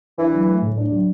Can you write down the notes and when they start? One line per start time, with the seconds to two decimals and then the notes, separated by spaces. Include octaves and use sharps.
0.18 E3 D4
0.33 F#3
0.48 A3
0.62 A2
0.78 D4
0.91 F#3